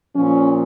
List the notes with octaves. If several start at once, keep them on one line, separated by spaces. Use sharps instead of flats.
A#2 F3 C#4